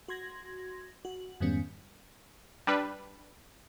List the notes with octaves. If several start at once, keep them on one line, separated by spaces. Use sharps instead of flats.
F#4 C6 G#6 A#6
F#4
F2 G#2 D#3 G3 B3 C#4
G3 D4 B4